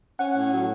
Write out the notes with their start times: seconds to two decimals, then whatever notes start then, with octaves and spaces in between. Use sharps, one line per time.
0.19 C#4 F#5
0.36 A2
0.52 F#3